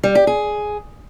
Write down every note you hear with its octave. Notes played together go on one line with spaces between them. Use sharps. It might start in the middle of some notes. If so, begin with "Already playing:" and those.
G3
G4
G#4